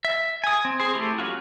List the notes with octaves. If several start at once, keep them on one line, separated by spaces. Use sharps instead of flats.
E5
G#5 D#6
C4
G#4 C5
A3 E4 G4
F#3 C#4 F4 F#4